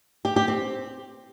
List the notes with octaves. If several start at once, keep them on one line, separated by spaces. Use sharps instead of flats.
G4
G4
C4